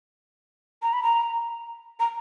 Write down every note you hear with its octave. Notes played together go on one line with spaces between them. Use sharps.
A#5
B5
A#5
A#5